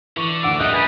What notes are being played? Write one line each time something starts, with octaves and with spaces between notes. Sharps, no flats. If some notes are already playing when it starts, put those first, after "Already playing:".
D3 E3 C#6 F7
D2 F#5 D6 E6
A#1 G3 D#4 D#5 E5 F#6 G6 F7
A2 G3 B4 G#5 A6